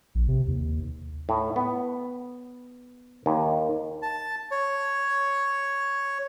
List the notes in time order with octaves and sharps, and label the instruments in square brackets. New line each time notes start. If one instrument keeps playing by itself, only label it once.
[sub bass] A#1
C3
D#2
[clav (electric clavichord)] A2
B3
D#2
[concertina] A5
C#5